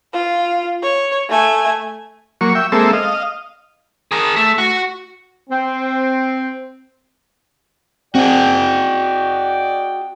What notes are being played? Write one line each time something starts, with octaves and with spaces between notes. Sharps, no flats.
F4
C#5
A3 G#5
F#3 A#3 C#6
E5 G5
G#3 A#3 C4 A4 E5
D#5 F5
G#4 A#4
A3
F#4
C4
C4 F#4 G#4 D5 D#5 G5